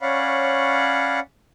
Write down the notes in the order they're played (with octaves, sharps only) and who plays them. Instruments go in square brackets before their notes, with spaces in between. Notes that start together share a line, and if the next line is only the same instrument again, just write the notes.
[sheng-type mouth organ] C#4 C#5 D5 F5 F#5 B5